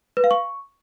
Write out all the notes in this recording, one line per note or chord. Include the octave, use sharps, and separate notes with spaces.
B4
F5
C#6